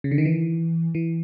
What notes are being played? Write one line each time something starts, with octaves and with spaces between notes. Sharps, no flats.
C#3
D3
D#3
E3
E3